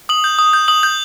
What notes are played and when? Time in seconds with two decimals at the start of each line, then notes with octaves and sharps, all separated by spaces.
0.09 D#6 F#7
0.24 G6
0.39 D#6
0.53 G6
0.68 D#6 F#7
0.83 G6